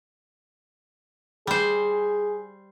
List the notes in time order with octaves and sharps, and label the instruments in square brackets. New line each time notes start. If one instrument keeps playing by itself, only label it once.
[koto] G3 C5 [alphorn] G#4